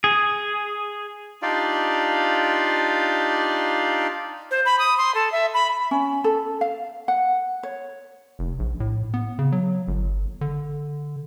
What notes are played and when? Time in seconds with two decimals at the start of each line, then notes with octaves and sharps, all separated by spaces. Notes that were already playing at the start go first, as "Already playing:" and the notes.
0.04 G#4
1.42 D4 D#4 F4 G4 D5 F5
4.51 C5
4.65 B5
4.79 D#6
4.98 C6
5.15 A4
5.32 E5
5.54 B5
5.91 C#4
6.24 A4
6.61 F5
7.08 F#5
7.63 C#5
8.39 F1
8.59 A#1
8.80 A2
9.14 B3
9.39 C#3
9.52 F#3
9.88 G1
10.41 D3